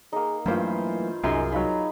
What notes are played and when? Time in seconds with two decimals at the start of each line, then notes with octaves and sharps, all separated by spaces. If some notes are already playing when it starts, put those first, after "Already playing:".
0.13 A#3 D#4 G#4
0.46 G2 E3 F#3 A3 A#3 F4 C5 B5
1.24 C2 F#2 D#4 G#4 A#4 C6
1.52 F#3 D#4 F4 B5